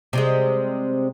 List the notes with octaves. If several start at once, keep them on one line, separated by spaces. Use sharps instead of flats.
C3 G3 G#3